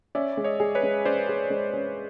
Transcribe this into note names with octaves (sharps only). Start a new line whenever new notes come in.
C#4 D5 E5
G#3
C#5 D#5
G#4
B4 C#5
G#3
C#4 C5 D5
G#4
G#3
C#4